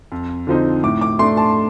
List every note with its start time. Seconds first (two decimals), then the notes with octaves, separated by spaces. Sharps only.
0.12 F2
0.47 D3 F3 C4 D#4
0.83 A2 D6
1.01 D6
1.19 A3 D4 C6
1.37 A5